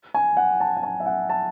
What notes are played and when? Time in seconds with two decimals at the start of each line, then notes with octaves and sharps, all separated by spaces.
0.14 G#5
0.37 F#5
0.60 A5
0.77 F#5
0.83 G#5
1.00 E5
1.06 F#5
1.29 A5